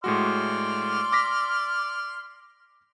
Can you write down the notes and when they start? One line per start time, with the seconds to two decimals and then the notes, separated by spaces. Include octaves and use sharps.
0.04 A2 G#3 F#4 D5 C6 F6
1.12 D6 A#6 B6